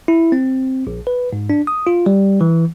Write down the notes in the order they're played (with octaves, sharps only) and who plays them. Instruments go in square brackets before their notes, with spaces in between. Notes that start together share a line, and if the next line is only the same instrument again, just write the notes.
[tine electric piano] E4
C4
A#1
B4
G#2
D4
D#6
F4
G3
E3